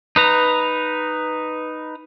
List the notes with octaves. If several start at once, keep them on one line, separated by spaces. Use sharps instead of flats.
D#4 B4 A#5